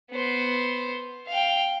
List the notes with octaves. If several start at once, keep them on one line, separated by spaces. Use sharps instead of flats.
B3 C5
F5 G5